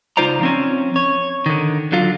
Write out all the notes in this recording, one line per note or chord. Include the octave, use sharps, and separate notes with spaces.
C#2 D#4 F4 C5 D5 A#5
F3 C4 C#4
C#5
D3 D#3
D3 F#3 F4